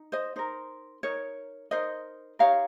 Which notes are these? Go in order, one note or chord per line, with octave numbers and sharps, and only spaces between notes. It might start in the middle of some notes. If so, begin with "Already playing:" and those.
Already playing: D#4
C5 D#5
D#4 A#4 C5
D#4 A#4 C#5
D#4 A#4 C5 D#5
D#4 G4 A#4 C#5 F5